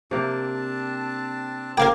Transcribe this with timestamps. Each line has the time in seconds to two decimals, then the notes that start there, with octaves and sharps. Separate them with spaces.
0.11 C3 A#3 C4 D4 A5
1.77 A#3 A#4 F5 G5